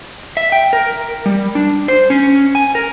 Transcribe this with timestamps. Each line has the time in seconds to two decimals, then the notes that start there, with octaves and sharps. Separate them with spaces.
0.37 E5
0.52 G5
0.73 A#4
1.26 G3
1.55 D4
1.88 C5
2.10 C#4
2.55 G#5
2.75 A#4